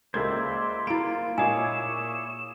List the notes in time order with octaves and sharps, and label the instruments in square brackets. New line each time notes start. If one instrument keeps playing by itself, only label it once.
[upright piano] C#2 A#3 G#6 [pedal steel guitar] C5 D5 E5 [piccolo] C6
[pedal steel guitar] A#3 F4 [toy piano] E4 B5 [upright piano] D7
[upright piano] A#2 [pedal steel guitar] E4 G#4 C#5 [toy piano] D#5 G#5 [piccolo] E7